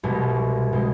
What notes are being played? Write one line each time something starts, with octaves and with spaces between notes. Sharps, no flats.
C2 B2 G#3
B2 G#3